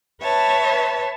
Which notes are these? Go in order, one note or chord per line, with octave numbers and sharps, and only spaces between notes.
B4 C#5 E5 A5